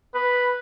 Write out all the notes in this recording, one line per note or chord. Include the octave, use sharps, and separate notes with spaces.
B4